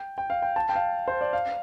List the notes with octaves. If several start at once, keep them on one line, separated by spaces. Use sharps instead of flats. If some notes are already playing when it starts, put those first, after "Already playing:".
Already playing: G5
G5
F5
G5
A5
G5
F5
C5
D5
F5